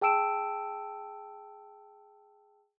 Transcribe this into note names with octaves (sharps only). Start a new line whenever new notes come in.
G#4 G5 A5 E6 D7 E7